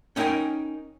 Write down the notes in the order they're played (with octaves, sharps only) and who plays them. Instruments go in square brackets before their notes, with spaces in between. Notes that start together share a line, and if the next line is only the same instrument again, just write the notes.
[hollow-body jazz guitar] C#4 D#4 E4 A#4 G5 G#5